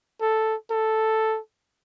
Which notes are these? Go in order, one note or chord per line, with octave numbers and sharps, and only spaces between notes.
A4
A4